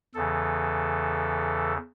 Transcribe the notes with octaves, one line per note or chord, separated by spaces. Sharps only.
E2 C#3 E3 A4